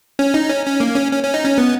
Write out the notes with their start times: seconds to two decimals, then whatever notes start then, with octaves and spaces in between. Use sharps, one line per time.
0.19 C#4
0.34 D#4
0.50 C#4
0.66 C#4
0.80 A#3
0.95 C#4
1.12 C#4
1.23 C#4
1.34 D#4
1.45 C#4
1.58 B3